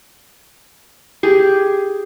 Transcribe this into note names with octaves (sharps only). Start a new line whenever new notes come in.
G4 G#4